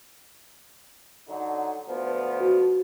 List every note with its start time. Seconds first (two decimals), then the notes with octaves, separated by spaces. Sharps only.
1.28 D3 F#3 D#4
1.88 D2 F3 B3
2.40 F#4